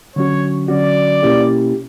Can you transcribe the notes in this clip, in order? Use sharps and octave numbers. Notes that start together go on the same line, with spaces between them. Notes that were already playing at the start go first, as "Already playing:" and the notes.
D3 F#3 C#4 F#4 C#5
D3 F#3 C#4 F#4 D5
B2 A#3 C#4 E4 G4